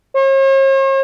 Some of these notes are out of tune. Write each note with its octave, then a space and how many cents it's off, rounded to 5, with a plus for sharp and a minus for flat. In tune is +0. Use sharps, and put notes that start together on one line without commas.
C#5 -45